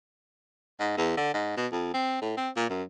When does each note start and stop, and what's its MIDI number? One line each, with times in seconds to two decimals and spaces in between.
0.80 0.93 44
0.97 1.16 40
1.17 1.33 50
1.34 1.56 44
1.57 1.67 47
1.72 1.89 41
1.94 2.18 60
2.22 2.33 45
2.37 2.50 60
2.56 2.67 46
2.70 2.83 42